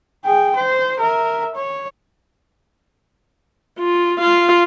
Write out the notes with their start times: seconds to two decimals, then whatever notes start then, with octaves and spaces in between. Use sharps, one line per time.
0.25 G#4 G5
0.56 C5
1.00 A#4 E5
1.55 C#5
3.79 F4
4.19 F4 F5